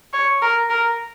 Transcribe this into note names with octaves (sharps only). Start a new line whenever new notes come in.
C#5
A#4
A#4